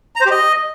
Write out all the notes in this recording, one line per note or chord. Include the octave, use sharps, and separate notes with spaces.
A#5
C5
G4
D#5